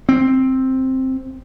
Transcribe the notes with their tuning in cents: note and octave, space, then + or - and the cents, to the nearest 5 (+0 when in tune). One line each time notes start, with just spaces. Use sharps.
C4 +5